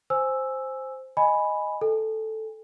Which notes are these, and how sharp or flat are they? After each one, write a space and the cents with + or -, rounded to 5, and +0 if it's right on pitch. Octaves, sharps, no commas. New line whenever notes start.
C5 +0 G#5 +0 E6 +0
D#5 +0 G#5 +0 B5 +0
A4 +0 G#5 -30